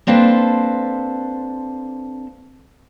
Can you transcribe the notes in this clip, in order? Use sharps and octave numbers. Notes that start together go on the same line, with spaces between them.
A#3 C4 D4 A4 B4 C5